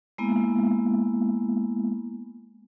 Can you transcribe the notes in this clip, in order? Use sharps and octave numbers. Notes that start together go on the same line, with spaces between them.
G#3 A#3 B3 E4